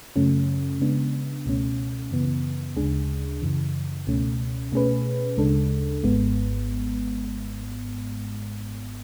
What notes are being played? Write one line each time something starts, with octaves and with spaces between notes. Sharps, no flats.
F#2 C#3 F#3 A3 C#4
C#3 G#3 B3 D4
C#2 B2 A3 C#4
F#2 C#3 E3 B3
D2 C#3 G#3 D4 G#4
F#2 C#3 E3
C#2 B2 A3 C#4
B2 A3 C#4 G#4 B4
D2 C#3 G#3 D4 A4
G#1 G#2 G#3 B3